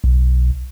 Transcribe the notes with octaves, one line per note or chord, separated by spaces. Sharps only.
B1